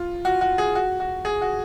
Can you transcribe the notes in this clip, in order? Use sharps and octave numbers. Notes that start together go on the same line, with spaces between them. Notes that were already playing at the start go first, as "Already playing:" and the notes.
Already playing: F4
F#4
F#4
G#4
F#4
F#4
G#4
F#4